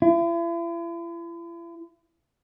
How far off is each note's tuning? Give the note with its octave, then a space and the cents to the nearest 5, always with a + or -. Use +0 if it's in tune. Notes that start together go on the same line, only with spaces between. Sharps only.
E4 +45